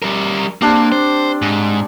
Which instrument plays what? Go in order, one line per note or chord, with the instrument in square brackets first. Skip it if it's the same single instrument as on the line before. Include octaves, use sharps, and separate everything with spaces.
[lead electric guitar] G3 A#4
[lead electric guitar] A#3 [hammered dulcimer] C4 D4 G4
[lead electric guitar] C5
G#2